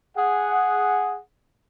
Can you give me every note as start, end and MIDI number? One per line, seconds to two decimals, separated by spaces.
0.16 1.18 68
0.16 1.18 78